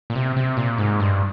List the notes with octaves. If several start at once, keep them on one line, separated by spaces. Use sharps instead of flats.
A#2
C3
C3
A#2
G#2
G2